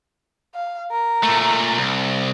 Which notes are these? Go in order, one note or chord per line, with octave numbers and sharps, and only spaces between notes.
F5
A#4
A#2 A3
C2